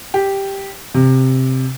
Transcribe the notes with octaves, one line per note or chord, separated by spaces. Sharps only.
G4
C3